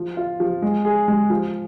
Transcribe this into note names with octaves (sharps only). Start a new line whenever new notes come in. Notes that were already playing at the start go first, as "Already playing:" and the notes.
Already playing: F3
F4
F3
G#3
G#4
G#3
F3